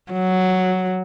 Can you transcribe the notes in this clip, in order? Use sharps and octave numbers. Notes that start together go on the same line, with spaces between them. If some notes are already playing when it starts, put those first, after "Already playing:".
F#3